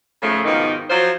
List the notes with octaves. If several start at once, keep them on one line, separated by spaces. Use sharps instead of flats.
G#2 C#3 F3 A3
G#2 B2 D#3 F3 A#3 D#4
F3 F#3 F4 C5